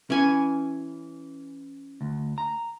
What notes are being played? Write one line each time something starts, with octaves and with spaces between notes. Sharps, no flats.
E3 C#4 G#5 C#6
D2
A#5